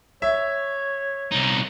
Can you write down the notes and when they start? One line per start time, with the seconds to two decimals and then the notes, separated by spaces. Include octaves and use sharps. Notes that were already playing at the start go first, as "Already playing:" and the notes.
0.22 C#5 E5
1.32 C2 D#4